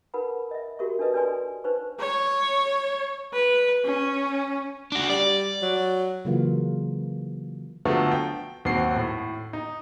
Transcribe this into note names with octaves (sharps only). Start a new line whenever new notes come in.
D#4 A#4 B4 F#5 B5
D#5 E5
F#4 G4 A#4 E5 C#6
D4 D#4 A4 B4 D#5
D4 A4 B4 D5 G#5 C6
D4 D#4 B4 C5 C#6
C#5
B4
C#4
D4 F#4
G3 D5
F#3
C#3 E3 F#3 A#3 F4 F5
D3 F3 F#3 A3 B3
G5
D#2 F#3 C4 F#4 C7
A2
D#4